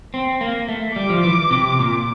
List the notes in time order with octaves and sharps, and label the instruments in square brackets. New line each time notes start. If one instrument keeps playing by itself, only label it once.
[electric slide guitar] C4
A#3
A3
[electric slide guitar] G3 [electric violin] D6
[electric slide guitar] F3
E3
C3
A#2